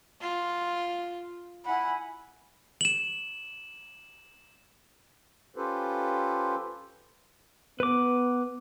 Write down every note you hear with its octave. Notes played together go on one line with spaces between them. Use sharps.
F4
E4 F#5 G#5 B5
E7 F#7
C#4 F4 G4 A4 B4 C5
B3 B4 D6